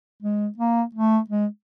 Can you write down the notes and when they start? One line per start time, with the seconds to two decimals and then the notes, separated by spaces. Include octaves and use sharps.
0.23 G#3
0.58 A#3
0.95 A3
1.30 G#3